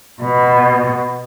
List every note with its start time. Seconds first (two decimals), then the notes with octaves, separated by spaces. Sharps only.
0.22 B2